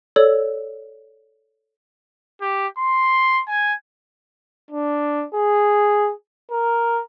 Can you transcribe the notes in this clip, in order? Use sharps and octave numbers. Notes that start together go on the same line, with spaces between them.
A4 C#5 D5 E6
G4
C6
G#5
D4
G#4
A#4